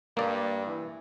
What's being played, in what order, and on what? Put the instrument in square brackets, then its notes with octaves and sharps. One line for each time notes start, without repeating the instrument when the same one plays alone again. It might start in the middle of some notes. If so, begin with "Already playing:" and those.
[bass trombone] G2 [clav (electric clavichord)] A#3 D5
[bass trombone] E3